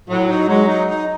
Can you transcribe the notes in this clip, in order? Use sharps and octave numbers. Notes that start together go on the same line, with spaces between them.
A2 F#3
D#4
F#3 G#3
D#4
D#4